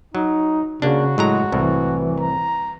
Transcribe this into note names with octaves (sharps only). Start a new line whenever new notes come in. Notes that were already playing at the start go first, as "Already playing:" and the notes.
F#3 D#4
C#3 A#3 D4 F#4
A2 F#3 G#3 A#5
C2 A2 E3
A#5